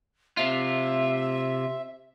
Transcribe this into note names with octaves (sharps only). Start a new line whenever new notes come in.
C3 F4 E5